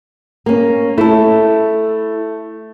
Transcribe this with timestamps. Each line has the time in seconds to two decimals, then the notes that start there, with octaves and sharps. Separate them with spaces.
0.46 A#3 C#4
0.98 A3 E4 A4